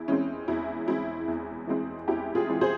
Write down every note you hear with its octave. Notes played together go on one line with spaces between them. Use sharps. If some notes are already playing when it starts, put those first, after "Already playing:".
Already playing: E2 E4
E3 G#3 C4 C#4
E2 E4
E3 G#3 C4 E4
E2
E3 G#3 C4
E2 E4 G4
F4 G#4
E3 G#3 C4
G#4 C5